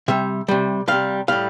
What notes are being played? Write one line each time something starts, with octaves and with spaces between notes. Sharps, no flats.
C3 G3 E5
C3 G3
C3 G3 F5
A2 G3 F5